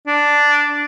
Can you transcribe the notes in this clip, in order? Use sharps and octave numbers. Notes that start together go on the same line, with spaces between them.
D4